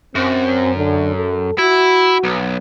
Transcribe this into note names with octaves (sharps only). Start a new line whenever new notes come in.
F#2 C4
D3
A4
E4 F#4
B1